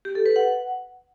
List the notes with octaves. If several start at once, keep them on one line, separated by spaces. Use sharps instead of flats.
G4
A4
B4
F#5